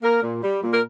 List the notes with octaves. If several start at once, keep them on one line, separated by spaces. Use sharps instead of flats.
A#3 A#4
A#2
G3
A#2
A#4